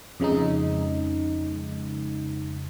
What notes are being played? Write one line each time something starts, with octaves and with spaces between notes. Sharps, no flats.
F2 C#3 G#3 D#4